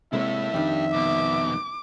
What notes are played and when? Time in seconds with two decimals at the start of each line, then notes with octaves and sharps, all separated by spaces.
0.13 C3 G#3 A#3 E4 C#5 E5
0.53 F2 D#3 D4 G4
0.94 C2 B2 D6